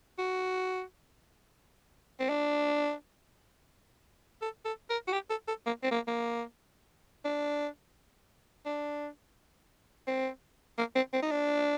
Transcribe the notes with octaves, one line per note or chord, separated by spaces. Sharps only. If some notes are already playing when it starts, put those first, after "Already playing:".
F#4
C4
D4
A4
A4
A#4
F#4
G4
A4
A4
A#3
C4
A#3
A#3
D4
D4
C4
A#3
C4
C4
D#4
D4